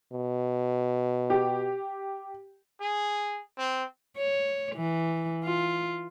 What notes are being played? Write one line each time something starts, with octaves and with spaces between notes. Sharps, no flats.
B2
G4
G#4
C4
C#5
E3
F4